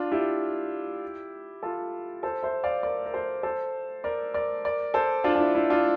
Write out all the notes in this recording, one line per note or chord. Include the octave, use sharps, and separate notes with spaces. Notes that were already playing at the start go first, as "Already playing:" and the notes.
Already playing: D4 F4
E4 G4
F4 A4
A4 C5
C5 E5
D5 F5
A#4 D5
A#4
A4 C5
A4 C5
A#4 D5
A#4 D5
A#4 D5
A4 C5
D4 F4
D4
E4
E4
D4 F4